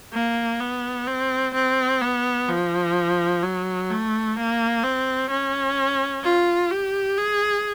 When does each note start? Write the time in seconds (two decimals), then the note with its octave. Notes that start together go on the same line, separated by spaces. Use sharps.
0.13 A#3
0.60 B3
1.07 C4
1.54 C4
2.01 B3
2.48 F3
3.43 F#3
3.90 A3
4.36 A#3
4.84 C4
5.30 C#4
6.24 F4
6.71 G4
7.18 G#4